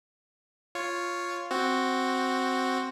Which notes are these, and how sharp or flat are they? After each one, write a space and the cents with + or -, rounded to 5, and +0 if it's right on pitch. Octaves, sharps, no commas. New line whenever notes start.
F4 +0 C#5 +0
C4 +0 F#4 +0